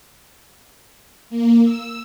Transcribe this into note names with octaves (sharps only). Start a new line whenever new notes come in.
A#3
E6